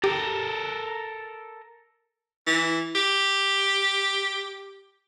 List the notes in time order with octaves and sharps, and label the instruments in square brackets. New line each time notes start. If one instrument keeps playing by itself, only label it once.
[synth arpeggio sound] G4 [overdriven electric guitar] A4 A#4
[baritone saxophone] E3
G4